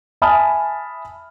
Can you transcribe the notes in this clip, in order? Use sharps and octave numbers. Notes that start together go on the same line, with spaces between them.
E5 G#5 A5 B5 D#6 F6